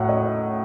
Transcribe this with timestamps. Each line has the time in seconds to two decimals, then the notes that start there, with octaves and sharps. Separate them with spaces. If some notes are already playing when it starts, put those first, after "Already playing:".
Already playing: A2 F#3 F#5
0.09 D#5